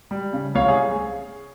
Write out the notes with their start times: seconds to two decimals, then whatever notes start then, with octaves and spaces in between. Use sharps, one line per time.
0.11 G3
0.33 C#3
0.55 C2 C#5 F5
0.68 G#4